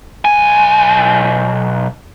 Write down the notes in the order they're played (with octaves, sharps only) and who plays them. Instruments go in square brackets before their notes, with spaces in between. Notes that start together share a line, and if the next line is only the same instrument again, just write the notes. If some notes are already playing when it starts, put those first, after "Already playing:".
[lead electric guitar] B1 G#5